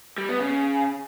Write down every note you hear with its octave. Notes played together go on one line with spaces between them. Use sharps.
G3
B3
C#3